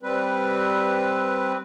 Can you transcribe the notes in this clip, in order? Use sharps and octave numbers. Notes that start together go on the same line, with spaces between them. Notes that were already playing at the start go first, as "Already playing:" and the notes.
G3 C4 B4